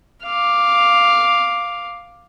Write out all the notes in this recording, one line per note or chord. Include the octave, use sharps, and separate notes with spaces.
F5 D6